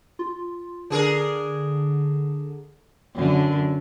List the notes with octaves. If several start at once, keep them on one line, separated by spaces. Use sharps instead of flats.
F4
D3 D4 G#4 A#4
F#2 D3